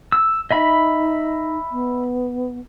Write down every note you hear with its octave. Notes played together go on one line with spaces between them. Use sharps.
E6
D#4 D#5 E5 B5
B3